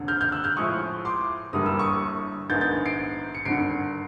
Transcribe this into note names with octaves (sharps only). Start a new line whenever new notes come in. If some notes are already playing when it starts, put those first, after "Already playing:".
Already playing: F1 D#2 D3
F6 G6
F6 G6
E6 F#6
F6 G6
A2 F3 G#3 C#6 D#6
C6 D6
G1 G2 E3 G3 A#3 D#6
E6
C#6 D#6
A#1 G#2 D#3 G#3 B3 G6 A6
G6 A6
C7 D7
C#7
G#1 G2 D3 C7 D7